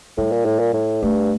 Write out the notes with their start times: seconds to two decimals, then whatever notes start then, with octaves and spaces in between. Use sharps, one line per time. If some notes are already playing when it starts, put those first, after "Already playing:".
0.17 A2 G3
0.32 A#2
0.45 A2
0.59 A#2
0.73 A2
1.02 G2 A3